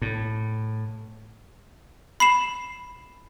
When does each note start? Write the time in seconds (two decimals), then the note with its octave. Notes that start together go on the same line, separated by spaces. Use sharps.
0.02 A2
2.20 B5 C7 E7